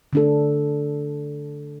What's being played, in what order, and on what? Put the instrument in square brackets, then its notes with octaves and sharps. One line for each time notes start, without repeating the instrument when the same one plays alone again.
[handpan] D3 A3 D4 A4